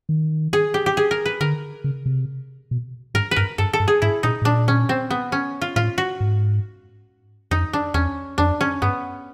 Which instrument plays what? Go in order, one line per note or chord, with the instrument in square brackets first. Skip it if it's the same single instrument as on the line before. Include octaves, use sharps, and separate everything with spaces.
[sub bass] D#3
[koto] G#4
G4
G4
G#4
A#4
B4
[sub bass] D3 [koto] A#4
[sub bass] C#3
C3
B2
[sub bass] G#2 [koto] A#4
[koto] B4
[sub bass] G2 [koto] A#4
[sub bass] G2 [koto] A4
[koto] A4
[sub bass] G2
[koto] G#4
[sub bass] G#2 [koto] E4
[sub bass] A#2 [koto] D#4
[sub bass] A2
[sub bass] A#2 [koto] D4
[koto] C#4
C4
B3
C#4
F4
[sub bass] A2 [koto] F4
[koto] F#4
[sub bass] G#2
[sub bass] F2 [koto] D#4
[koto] D4
[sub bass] E2 [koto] C#4
[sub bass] F2 [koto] D4
[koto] C#4
[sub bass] G2 [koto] B3